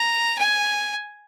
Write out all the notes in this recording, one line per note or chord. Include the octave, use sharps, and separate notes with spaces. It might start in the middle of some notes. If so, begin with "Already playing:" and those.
Already playing: A#5
G#5